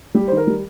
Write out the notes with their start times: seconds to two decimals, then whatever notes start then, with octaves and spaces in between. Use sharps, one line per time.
0.15 G3 G4
0.28 C5
0.32 D#3
0.37 A#4
0.47 G3